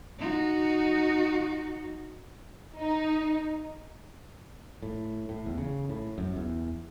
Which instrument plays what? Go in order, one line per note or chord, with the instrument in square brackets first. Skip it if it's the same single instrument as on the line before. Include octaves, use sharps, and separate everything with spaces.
[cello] D#4 F#4
[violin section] D#4
[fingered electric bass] A2
A2
E2
C#3
A2
F#2
E2